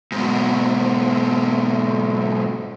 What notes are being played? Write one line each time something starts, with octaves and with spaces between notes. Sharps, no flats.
G#2 B2